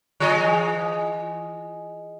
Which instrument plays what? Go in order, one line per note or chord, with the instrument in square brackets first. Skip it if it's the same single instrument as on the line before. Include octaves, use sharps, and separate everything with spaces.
[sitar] E3 G#4 D#5